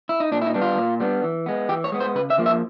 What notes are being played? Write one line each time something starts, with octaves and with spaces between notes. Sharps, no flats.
E4
D#4
A#2 D4
E4
D#4
G3 B3 D4
F4
A#2
G3 B3 D4
E3
G#3 B3
E3 G4
C#5
G#3 B3
C5
C#3 B4
E5
F3 A#3
E5